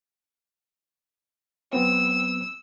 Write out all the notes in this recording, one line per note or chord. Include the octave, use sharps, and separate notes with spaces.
F#3 B3 C4 E6